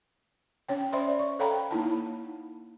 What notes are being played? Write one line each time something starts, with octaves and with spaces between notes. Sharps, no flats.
C#4 C#5 G5
C5 D5 E5 B5 C6
C#6
A4 C#5 F5 G5 A#5 B5
A#3 D#4 E4 A5